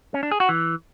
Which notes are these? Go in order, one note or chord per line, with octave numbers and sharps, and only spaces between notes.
C#4
D4
G#4
F#4
E3